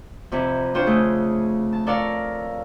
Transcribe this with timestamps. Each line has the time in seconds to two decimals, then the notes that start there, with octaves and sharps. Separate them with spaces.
0.31 F2 C3 E3
0.74 D4 F4 C5 C#5 G5
0.86 C#3 A3 G#4
1.72 A5
1.86 A4 A#4 C#5 D5 F5